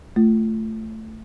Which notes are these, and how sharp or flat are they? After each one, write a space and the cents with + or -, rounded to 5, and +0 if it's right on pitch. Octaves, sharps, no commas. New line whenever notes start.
A3 +0 F4 -20